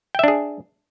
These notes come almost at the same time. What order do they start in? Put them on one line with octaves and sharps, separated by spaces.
G5 E5 D4 G#4